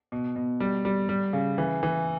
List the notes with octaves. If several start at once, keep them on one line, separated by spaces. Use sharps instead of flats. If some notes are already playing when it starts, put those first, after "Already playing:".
B2
B2
G3
G3
G3
C#3
E3
E3